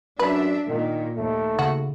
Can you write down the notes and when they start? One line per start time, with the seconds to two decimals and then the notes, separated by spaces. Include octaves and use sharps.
0.19 F#2 D4 B4 E5
0.68 A#2 D#3
1.17 D#2 A3
1.59 C#3 F#4